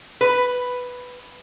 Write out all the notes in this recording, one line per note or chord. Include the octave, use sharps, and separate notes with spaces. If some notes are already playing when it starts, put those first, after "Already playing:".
B4